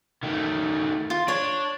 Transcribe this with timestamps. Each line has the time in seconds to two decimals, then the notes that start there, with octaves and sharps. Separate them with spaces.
0.23 D#3 A3
1.10 F4
1.28 D4 C#5